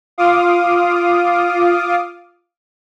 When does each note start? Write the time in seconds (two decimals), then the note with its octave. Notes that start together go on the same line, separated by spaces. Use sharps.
0.18 F4 F5 D6 D#6